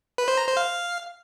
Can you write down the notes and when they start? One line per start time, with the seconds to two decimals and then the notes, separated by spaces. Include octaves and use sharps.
0.18 B4
0.28 C5
0.37 A#5
0.47 C5
0.57 F5